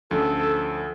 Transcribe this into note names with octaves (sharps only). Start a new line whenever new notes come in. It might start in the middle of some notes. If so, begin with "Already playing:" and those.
D2 F3 C#4 A4